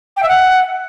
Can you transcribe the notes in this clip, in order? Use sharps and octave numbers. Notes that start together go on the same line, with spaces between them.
G5
E5
F#5